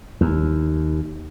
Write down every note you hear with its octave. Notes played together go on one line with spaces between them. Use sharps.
D#2